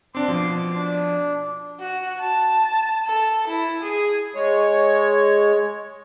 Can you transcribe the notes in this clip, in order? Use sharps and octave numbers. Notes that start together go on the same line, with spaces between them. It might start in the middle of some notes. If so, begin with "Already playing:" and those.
C4 D4 D5 C6 D6
B2 F3
D4
F#4
A5
A4
E4
G#4
G#3 C#5